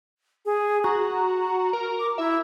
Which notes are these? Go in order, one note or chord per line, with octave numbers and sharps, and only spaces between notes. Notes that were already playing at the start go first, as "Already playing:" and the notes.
G#4
F#4 A#5
A#4
D6
E4 E5